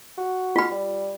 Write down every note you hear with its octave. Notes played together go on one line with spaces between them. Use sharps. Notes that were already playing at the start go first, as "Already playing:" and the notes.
F#4
F4 B5
G3